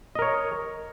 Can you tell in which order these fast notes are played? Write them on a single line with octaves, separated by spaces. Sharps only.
D#5 A#4 C#5